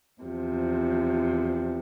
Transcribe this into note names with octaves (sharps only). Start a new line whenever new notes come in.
E2 C3 F3